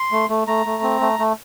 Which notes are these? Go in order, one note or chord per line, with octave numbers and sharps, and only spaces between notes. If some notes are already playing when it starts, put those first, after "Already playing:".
Already playing: C6
A3
A3
A3 A#5
A3
C4
A3
A3